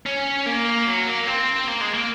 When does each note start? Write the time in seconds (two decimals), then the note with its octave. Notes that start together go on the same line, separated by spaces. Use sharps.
0.06 C#4
0.46 A#3
0.87 F#3
1.07 A#3
1.27 C4
1.68 A#3
1.81 G#3
1.94 A#3